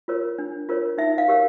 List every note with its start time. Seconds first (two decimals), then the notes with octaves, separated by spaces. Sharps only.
0.08 F4 A#4 C#5
0.39 D4
0.69 F4 A#4 C#5
0.98 D#4 E5
1.18 F5
1.28 G4 A#4 C#5